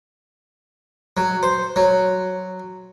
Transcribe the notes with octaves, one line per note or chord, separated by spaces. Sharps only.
F#3
C5
F#3